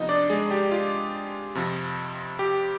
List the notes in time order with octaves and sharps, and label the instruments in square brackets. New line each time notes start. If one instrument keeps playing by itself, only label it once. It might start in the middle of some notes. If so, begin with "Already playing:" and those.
Already playing: [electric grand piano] C3 F3 B3 D#4 D#5
D4 D5
G#3 G#4
G4
F4
F2 C3 F3
G4